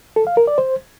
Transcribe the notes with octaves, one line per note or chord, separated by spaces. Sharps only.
A4
F5
A#4
D5
C5